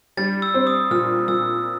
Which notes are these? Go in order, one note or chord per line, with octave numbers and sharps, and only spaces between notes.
G3 A6
E6
C4
D#6
A#2 F6
A#2 E6